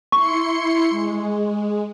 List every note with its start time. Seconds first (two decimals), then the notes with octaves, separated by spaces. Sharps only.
0.12 E4 C6 C#6 C#7
0.90 G#3